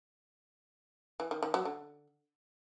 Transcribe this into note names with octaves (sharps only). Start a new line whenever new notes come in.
E3
D#3
D#3
F#3
D3